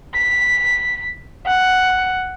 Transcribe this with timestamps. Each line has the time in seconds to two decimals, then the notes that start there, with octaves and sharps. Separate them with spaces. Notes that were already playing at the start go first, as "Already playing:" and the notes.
0.15 B6
1.46 F#5